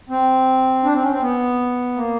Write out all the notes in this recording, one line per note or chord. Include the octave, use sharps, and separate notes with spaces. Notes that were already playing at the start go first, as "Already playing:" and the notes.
C4
D4
C4
C#4
C4
B3
A#3